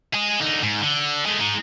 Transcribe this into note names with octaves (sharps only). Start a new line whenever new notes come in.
G#4 D#5
D3 D#4
G#2
D3
G#3 A3
G#3 D#4